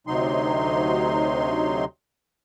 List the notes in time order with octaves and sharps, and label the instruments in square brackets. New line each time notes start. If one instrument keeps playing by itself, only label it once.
[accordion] D2 C3 F#3 D#4 C6